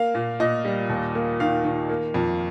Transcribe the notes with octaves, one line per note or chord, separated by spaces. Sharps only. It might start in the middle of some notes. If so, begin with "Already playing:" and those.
Already playing: A#3 F5
A#2
A#2 D#5
G3
D#2
A#3
D#3 F5
D#3
A#3
F2